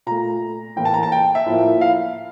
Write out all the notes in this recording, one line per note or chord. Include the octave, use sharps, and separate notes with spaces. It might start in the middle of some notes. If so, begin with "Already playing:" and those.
A#2 A3 A#5
A2 E3 A#3 G5
A5
A#5
A5
G5
E5
A2 F3 A#3
F5